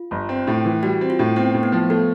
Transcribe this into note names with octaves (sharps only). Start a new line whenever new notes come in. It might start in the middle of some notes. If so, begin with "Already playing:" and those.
Already playing: F4
G1
C4
A2
E3
G3 F#4
C4
F4
A2
B3 C4
A2
B3
F3
A3 B3